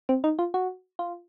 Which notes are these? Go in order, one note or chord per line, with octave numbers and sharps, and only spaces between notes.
C4
D#4
F4
F#4
F4